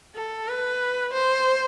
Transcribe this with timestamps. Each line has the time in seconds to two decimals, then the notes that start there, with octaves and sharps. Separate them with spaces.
0.15 A4
0.48 B4
1.13 C5